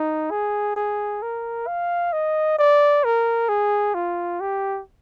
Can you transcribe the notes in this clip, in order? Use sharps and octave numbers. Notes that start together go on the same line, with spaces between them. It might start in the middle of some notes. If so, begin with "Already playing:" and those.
Already playing: D#4
G#4
G#4
A#4
F5
D#5
D5
A#4
G#4
F4
G4